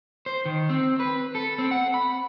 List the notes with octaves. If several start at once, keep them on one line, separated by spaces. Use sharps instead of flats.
C5
D#3
C4
B4
A4
C4
F#5
B5